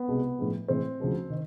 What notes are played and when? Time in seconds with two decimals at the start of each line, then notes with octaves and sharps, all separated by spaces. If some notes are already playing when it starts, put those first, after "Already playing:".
Already playing: B3
0.08 C2 B2 G#3
0.39 A2 F3 G#3
0.68 A2 E3 G#3 C4
1.00 D2 C#3 F3 G#3
1.30 D#3